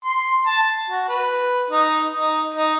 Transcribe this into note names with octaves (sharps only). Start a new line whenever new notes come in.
C6
A5
F#4
B4
D#4
D#4
D#4